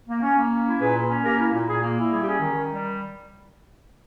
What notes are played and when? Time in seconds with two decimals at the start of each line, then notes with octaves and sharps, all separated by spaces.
0.08 A#3
0.22 C#4
0.36 A#3
0.51 C#4
0.66 E4
0.80 A#2 G#4 B4
0.96 A#3
1.09 C#4
1.24 A#3 G4 A#4
1.38 E4
1.53 A#2
1.67 A#2 G#4
1.82 A#3
1.97 E4
2.11 G3 G#4
2.20 G4
2.27 C#4 G#4
2.40 D#3
2.55 D#3
2.70 G3